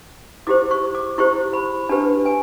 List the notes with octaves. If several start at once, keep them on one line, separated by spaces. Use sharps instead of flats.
E4 G4 C5 D6
C#6
D6
E4 G4 C5 C#6
B5
D4 G4 B4 A5
G#5